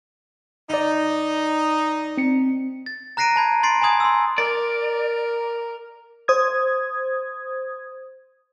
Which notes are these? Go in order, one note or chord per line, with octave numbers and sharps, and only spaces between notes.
G1 D#4 D5
C4 C#7
A6
A#5 F#6 A#6 C7 D7 D#7
A5 B5 G#6
C6 A6 C7 D7
G#5 A#5 C6 D#6 G#6
C6 E6
A#4 D5
C5 D#6 G#6